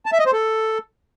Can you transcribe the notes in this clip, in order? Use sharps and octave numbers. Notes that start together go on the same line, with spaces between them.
A5
E5
D#5
C5
A4